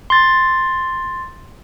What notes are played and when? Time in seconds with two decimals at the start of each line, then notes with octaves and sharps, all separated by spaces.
0.10 C6 A6